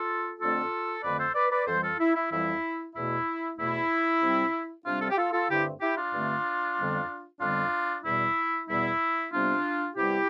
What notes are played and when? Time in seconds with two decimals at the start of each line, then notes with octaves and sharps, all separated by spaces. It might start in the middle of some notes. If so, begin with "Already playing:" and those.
Already playing: F4 A4
0.39 F2 D3 A3 C4 F4 A4
1.03 F2 D3 A3 C4 B4 D5
1.18 A4 C5
1.35 B4 D5
1.51 B4 D5
1.66 F2 E3 G3 A4 C5
1.83 F4 A4
1.99 E4
2.15 E4
2.31 F2 E3 G3 E4
2.95 E2 B2 A3 E4
3.58 E2 B2 A3 E4
4.21 C3 G3 C4
4.85 C3 G3 C4 D4 F4
5.01 F4 A4
5.10 G4
5.17 F4 A4
5.33 F4 A4
5.49 G2 D3 A3 C4 E4 G4
5.81 E4 G4
5.97 D4 F4
6.12 G2 D3 A3 C4
6.76 F2 D3 G3 B3
7.40 F2 D3 G3 B3 D4 F4
8.04 E2 B2 G3 B3 E4
8.68 E2 B2 G3 B3 E4
9.31 C3 G3 B3 D4 F4
9.95 C3 G3 B3 E4 G4